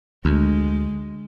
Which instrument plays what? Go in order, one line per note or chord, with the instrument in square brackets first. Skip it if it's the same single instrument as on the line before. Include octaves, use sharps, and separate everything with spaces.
[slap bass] D2 [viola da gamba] G#3